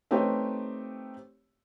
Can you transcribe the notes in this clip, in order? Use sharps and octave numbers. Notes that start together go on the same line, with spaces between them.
A3 C4 D#4 G4 B4 C#5